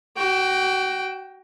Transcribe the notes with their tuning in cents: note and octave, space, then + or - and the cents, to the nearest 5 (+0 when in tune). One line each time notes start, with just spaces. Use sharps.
F#4 +30 G5 +0